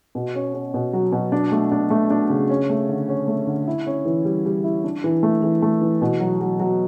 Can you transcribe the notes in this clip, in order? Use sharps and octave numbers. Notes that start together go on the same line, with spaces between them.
B2
C#4
C#4
B2
F#3
B2
D4
A3
D4
A3
D4
C#3
C#4
A3
D3
C#4
A3
D3
E4
C#4
E3
G3
G3
E4
D4
E3
A3
E3
A3
E3
B2
F#3
F#3
F#3